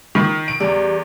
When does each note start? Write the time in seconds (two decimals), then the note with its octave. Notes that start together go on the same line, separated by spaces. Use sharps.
0.15 D#3
0.48 D7
0.60 E2 G3